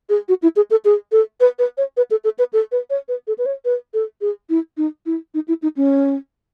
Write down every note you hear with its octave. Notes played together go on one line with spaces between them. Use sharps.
G#4
F#4
E4
G#4
A4
G#4
A4
B4
B4
C#5
B4
A4
A4
B4
A4
B4
C#5
B4
A4
B4
C#5
B4
A4
G#4
E4
D#4
E4
D#4
E4
D#4
C#4